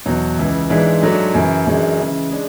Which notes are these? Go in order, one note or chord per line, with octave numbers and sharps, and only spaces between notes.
E2 B2 F#3
C#2 C#3 E3
G#2 E3 G#3 D4
G#2 F#3 A3 D4
F#2 C#3 E3
F#2 E3 G#3 D4
C#3 E3 G#3
G#3 D4